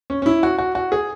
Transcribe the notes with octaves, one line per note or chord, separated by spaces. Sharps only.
C#4
C#4
E4
F#4
F#4
F#4
G#4